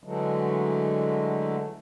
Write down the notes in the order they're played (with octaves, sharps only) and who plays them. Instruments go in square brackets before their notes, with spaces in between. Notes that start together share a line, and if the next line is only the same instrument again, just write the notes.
[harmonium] D3 E3 F#3 G#3 A3